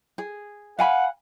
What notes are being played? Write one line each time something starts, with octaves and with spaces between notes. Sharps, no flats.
G#4
F5 F#5 G#5 B5